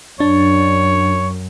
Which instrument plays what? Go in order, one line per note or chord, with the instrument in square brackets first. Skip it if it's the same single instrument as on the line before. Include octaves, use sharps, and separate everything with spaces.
[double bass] F#2 [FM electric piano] D4 [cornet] C#5